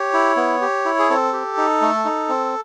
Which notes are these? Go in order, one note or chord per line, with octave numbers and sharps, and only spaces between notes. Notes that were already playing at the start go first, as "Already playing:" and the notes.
Already playing: G4 C#5
E4
B3
G4
E4
G#4
C4 A4
G4
D#4
A3
D#4
C4